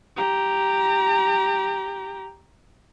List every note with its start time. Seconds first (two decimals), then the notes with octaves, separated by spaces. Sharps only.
0.16 G4 A#5